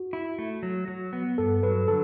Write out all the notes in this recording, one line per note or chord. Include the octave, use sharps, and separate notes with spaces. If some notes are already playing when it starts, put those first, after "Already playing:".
Already playing: F#4
E4
A3
F#3
F#3
B3
G2 A4
F#3 B4
D3 A4